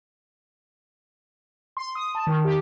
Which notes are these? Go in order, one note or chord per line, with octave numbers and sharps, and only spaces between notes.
C6
D#6
A5
D#3
G4